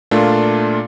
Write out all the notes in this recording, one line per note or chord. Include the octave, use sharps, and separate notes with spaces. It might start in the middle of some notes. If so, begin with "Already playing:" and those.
A#2 A3 A#3 D4 F4